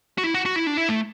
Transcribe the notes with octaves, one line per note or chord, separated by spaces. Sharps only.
F#4
E4
F#4
F#4
E4
D4
E4
A3